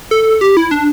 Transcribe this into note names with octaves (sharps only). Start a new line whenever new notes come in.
A4
G4
E4
D4